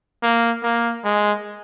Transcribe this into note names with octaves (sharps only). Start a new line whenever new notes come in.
A#3
A#3
G#3